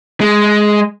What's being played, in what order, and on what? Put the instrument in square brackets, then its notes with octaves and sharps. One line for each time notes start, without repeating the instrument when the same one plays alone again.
[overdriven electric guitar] G#3